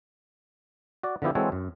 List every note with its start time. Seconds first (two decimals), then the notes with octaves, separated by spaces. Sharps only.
1.03 F#4 D5
1.22 D3 F3 B3 E4 G4
1.35 E3 G#3 C4 F#4 A4 C#5
1.52 F#2